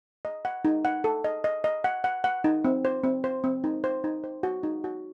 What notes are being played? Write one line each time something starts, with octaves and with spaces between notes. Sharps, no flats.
D#5
F#5
D#4
F#5
A4
D#5
D#5
D#5
F#5
F#5
F#5
D#4
C4
C5
C4
C5
C4
D#4
C5
D#4
C5
F#4
D#4
F#4